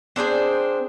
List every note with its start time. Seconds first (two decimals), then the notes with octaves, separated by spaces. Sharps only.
0.16 C4 D4 G#4 C5